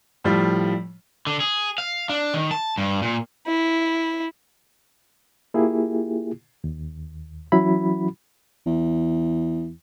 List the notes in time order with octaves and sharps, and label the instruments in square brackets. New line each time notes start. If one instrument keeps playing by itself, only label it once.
[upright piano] A2 F3 G3
[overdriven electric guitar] D3
G#4
F5
D4
D#3
A5
G2
A#2
[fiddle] E4
[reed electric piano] A#3 E4 F4 G4 G#4
D#2
E3 F#3 C#4 E4 F#4 B5
[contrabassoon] E2